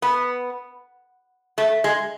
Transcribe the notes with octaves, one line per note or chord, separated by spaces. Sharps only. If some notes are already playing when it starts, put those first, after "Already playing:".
B3
A3
G#3